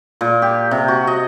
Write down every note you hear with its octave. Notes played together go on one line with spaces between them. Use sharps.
A#2
G4
C3
F#4
D#5